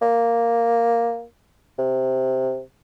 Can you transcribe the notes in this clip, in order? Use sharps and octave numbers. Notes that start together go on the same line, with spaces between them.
A#3
C3